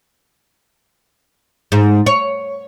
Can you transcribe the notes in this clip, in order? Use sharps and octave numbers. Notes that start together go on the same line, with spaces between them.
G#2
C#5